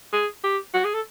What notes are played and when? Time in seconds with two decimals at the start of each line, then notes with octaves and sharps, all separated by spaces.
0.13 G#4
0.44 G4
0.74 F#4
0.85 G#4
0.94 A4